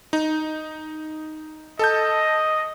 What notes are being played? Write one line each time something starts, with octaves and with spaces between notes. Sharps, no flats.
D#4
A4 D#5 A5 G6